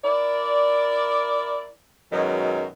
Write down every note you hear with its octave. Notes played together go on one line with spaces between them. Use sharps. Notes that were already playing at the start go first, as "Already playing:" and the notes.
E4 A#4 D5
F#2 B2 D#3 F#3 G#3